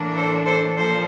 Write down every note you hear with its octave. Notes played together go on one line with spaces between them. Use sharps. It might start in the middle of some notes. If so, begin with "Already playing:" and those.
Already playing: A2 E3 A#3 D4
A4 C5
A4 C5
A#2 F3 A4 C5